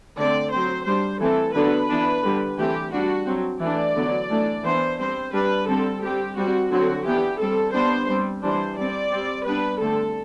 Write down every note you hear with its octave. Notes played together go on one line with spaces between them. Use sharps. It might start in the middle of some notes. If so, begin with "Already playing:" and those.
D3 A3 C4 D5
F#3 C4 C5
G3 D4 C5
E3 A3 C4 A4
D3 F#3 B3 D4 B4
E3 B3 D4
D3 G3 D4
E3 A3 C4 G4
G3 D4 F#4
F#3 C4
E3 A3 D4 D5
D3 F#3 B3
E3 A3 D4
E3 B3 D4 C5
G3 C4 C5
G3 D4 B4
D3 G3 C4 A4
G3 C4 G4
G3 C4 F#4
D3 F#3 C4 F#4
E3 B3 D4 G4
G3 C4 A4
G3 B3 D4 C5
G3 C4
E3 G3 D4 C5
G3 C4 D5
G3 C4
G3 B3 D4 B4
D3 A3 C4 A4